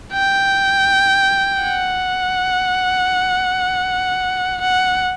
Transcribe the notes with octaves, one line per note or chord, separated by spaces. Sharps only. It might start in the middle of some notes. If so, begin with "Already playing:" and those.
G5
F#5
F#5